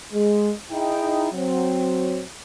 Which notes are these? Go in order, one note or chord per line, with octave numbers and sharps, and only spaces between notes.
G#3
D#4 E4 G#4 G5
F#3 C4